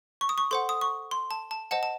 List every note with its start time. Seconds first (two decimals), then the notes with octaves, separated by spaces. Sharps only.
0.21 C#6
0.29 D#6
0.38 C#6
0.51 A4 C5 F#5 C6
0.69 D#6
0.81 C#6
1.11 C6
1.31 A5
1.51 A5
1.71 C5 D#5 F#5 A5
1.83 A5